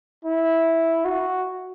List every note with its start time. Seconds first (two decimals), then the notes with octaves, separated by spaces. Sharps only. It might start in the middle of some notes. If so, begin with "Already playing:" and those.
0.25 E4
1.05 F#4